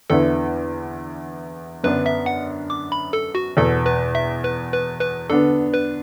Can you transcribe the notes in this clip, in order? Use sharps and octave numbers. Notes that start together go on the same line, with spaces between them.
E2 D3 B3 E4 A4
F#2 D3 B3 D4 B4
E5
F#5
D6
B5
A4
F#4
E2 B2 B3 A4
B4
E5
B4
B4
B4
D3 B3 D4 A4
B4